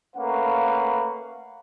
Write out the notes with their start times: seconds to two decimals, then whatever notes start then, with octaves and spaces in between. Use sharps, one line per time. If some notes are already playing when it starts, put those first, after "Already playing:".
0.16 A3 A#3 C#4 B4 F5 F#5